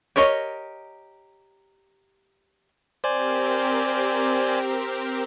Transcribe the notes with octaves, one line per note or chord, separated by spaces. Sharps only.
G4 A#4 C#5 D#5
C4 G4 A#4 C5 D5 G#5